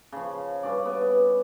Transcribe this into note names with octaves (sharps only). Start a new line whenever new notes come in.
C#3 F3
G2 C#4 D5
B3